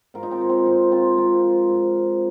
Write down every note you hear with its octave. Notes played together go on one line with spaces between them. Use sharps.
G#2 F4 A#4
D#4
C4 F4
D#3
C4
G#2 D#4
D#3 C4 F4
G#2 F4 A#4
F3
G#2
F3